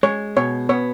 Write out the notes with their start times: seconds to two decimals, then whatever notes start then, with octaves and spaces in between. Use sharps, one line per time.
0.03 G#3 C#5
0.37 B2 C#5
0.69 B3 C#5